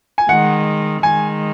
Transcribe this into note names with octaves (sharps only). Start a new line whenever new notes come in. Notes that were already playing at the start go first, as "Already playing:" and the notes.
G#5
D#3 G#3 F#5
D#3 G#3 G#5